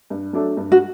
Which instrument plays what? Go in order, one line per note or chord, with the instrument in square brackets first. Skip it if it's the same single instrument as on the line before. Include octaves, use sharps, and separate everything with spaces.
[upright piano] G2
F#3 A3 D4 A4
G2
[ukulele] F#4